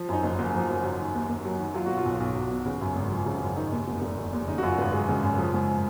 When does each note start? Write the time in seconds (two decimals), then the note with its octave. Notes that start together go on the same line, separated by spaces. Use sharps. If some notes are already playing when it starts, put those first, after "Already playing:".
Already playing: F3
0.09 F#2 D#4
0.23 F#1
0.39 F#1
0.54 F3
0.69 F#2
0.83 F#3
0.99 D#3
1.14 D#2
1.29 D#2
1.45 F#3
1.59 D#3
1.74 F#3 F4
1.86 B2 F#4
1.97 F4
2.06 B1
2.20 B1
2.35 F#3
2.51 B2
2.66 C#3
2.81 F#2
2.96 G#1
3.12 F3
3.26 C#3
3.42 F#2
3.56 D#3 D#4
3.72 D#2
3.88 F1
4.02 F1
4.17 D#3
4.33 D#2
4.48 C#3 D#4
4.58 F#4
4.63 F#2 F4
4.78 G#1 B4
4.93 G#3
5.08 C#3
5.23 F#2
5.38 F3
5.54 G#2